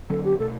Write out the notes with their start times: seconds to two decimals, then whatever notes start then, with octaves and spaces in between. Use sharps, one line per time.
0.10 D3 F#3 C#4 A4
0.24 G4
0.39 B2 A3 A4